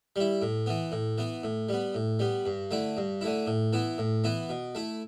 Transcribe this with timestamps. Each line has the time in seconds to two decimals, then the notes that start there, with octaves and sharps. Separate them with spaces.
0.16 G3 E4
0.42 A2
0.66 E3 B3
0.92 A2
1.18 E3 B3
1.43 A2
1.69 G3 B3
1.94 A2
2.19 G3 B3
2.46 G2
2.71 D3 A3 E4
2.97 G2
3.21 D3 A3 E4
3.47 A2
3.73 E3 B3 E4
3.98 A2
4.24 E3 B3 E4
4.49 B2
4.75 A3 E4